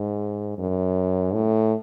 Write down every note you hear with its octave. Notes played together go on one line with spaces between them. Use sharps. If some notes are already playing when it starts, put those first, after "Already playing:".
Already playing: G#2
F#2
A2